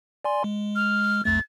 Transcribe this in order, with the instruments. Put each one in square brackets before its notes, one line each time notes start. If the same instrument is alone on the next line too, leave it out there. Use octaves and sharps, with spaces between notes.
[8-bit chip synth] D5 G#5 C6
G#3
[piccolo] F6
[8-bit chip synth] B1 F2 A3 [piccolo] A6